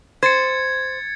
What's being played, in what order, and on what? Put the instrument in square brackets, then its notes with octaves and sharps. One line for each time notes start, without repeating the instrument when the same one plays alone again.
[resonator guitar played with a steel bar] C5 [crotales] G#6 A6 C#7